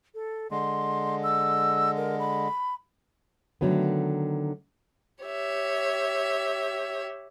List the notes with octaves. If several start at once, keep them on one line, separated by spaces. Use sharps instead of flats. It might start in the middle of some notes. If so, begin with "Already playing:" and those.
A4
D3 G#3 C6
E6
A#4
B5
D3 D#3 F#3 A3 B3
G4 C#5 E5